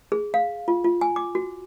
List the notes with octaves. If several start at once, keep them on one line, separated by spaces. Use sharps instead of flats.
G#4
F5
F4
F4
G#5
D6
F#4